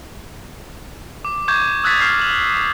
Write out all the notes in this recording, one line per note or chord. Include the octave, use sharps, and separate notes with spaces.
D6
C#6 D6 G6 G#6 E7
D#6 E6 F#6 G#6 A6 B6
D6 F6 G6 C7
F#7